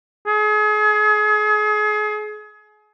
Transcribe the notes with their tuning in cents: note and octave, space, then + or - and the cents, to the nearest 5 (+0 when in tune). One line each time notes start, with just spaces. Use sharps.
G#4 +35